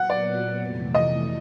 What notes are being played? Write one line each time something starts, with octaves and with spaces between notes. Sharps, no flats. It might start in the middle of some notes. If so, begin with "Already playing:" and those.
Already playing: A#2 F#3 B3 F#5
D5
F2 C3 E3 A3
D#5